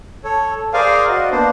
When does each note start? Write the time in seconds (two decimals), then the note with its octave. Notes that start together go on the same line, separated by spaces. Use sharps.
0.24 A4 C#5
0.73 G#4 A#4 C5 D5 F5 G#5
1.08 F#4 C5 D5 D#5
1.31 A#3 B3 D4 C5